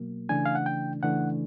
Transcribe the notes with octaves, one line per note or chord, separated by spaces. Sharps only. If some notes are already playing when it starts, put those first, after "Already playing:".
Already playing: B2 F#3 A#3
C#3 E3 A3 D4 G#5
F5
F#5
G5
C#3 E3 A3 D4 F#5